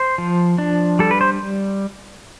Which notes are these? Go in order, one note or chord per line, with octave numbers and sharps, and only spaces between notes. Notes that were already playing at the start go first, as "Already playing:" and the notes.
Already playing: C5
F3
D4
G3 A4
B4
C5